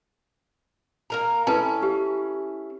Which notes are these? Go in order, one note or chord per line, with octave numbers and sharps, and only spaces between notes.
A#3 A#4 A#5
C#4 E4 A4 B4 A5
G4